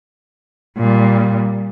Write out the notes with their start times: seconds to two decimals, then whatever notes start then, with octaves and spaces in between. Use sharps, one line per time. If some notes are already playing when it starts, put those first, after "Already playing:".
0.78 A#2 G3